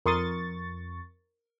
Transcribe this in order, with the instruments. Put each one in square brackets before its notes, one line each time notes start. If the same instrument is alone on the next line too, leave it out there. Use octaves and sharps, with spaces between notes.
[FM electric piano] F2 C#6 A6 [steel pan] A#4 C6 D#6